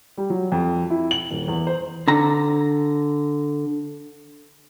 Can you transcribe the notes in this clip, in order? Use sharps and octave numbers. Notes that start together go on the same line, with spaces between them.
G3
F#3
F2
E4
F#7
D#1
E2
C5
D3 A#5